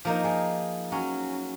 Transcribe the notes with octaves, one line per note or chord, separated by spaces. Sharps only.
F3 A#3 D#4
F3 G#4
F#3 C#4